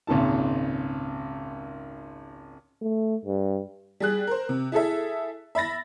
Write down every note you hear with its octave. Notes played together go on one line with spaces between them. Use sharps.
G#1 C#2 A#2 D#3 A5
A3
G2
G3 G#4 F#6
A#4 C5
C3
E4 G#4 A4 E5
E5 B5 A6 A#6